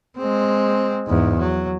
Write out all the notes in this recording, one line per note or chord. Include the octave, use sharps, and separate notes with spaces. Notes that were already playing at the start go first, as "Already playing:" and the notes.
G#3 C4
E2 G#2
F#3